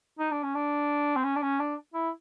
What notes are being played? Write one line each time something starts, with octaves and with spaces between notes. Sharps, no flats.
D#4
D4
C#4
D4
C4
C#4
D4
C#4
D4
E4